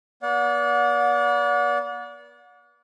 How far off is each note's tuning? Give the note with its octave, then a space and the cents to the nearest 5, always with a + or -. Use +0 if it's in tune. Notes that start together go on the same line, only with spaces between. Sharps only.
B3 -35 D5 -30 F#5 -40